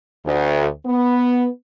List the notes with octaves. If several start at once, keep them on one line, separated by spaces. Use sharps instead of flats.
D2
B3